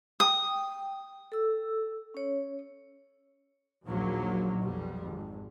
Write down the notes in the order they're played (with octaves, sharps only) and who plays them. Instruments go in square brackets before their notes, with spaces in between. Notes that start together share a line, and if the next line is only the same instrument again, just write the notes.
[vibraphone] G5 [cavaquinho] D#6
[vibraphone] A4 E6
C#4 C#5
[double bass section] A#1 D#2 F#3 A#3
B1 F2 G3
G#1